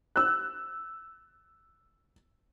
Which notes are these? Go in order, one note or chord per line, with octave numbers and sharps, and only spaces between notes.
E6 F#6